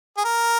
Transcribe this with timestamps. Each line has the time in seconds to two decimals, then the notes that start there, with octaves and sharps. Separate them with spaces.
0.17 G#4
0.24 A#4